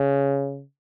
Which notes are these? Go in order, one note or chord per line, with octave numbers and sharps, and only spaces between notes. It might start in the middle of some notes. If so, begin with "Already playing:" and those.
Already playing: C#3